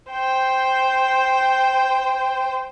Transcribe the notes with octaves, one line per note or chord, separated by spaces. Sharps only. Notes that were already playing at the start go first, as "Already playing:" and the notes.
C5 G5